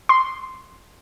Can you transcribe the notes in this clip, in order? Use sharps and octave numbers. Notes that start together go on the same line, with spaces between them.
C6